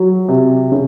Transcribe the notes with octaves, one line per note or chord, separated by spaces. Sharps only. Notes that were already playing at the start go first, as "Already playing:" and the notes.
Already playing: F#3
C3
C#3